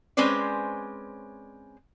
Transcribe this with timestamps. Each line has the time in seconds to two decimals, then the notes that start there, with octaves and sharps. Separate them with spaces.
0.17 G#3 C4 C#4 B4 C5 D5